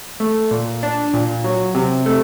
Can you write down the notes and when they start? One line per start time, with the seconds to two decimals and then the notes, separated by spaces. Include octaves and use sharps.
0.20 A3
0.51 A#2
0.83 D4
1.14 A#2
1.44 F#3
1.75 C3
2.06 A3